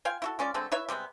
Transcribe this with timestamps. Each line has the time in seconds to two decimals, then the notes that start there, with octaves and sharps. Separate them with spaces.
0.05 F4 F5 G5 G#5
0.22 E4 F#4 A4
0.39 G#3 C#4 F4 D5
0.54 D3 G#3 A3 C4
0.72 E4 B4 C#5 E5
0.89 C3 G3 G#3 B3